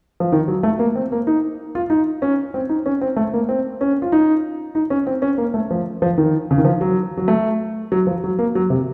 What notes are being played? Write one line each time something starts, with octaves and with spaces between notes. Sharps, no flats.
F3
D#3
F#3
A3
A#3
C4
A#3
D#4
F4
D#4
C#4
C4
D#4
C#4
C4
A3
A#3
C4
C#4
F4
D#4
D#4
C#4
C4
C#4
A#3
A3
F3
F3
D#3
C#3
D#3
F3
F#3
F#3
A3
F#3
F3
F#3
A#3
F#3
C3